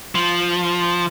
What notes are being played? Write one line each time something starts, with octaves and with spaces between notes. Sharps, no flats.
F3